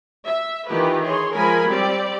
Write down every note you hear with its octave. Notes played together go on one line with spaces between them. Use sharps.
E5
D#3 E3 F4 G4 B4
G#4 C#5 C6
F3 G#3 A#4 G#5 B5
G3 C4 G4 D5